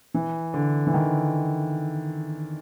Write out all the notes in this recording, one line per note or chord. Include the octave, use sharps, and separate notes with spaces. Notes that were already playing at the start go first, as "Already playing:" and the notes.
E3
D3
E3
D#3